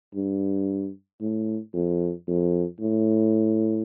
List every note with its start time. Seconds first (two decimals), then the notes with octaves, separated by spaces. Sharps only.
0.15 G2
1.21 A2
1.74 F2
2.28 F2
2.80 A2